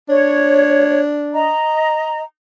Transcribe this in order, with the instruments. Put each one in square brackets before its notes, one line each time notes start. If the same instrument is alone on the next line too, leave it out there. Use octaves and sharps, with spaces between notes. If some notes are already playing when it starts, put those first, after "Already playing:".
[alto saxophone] D4 [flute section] C#5
[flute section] D#5 A#5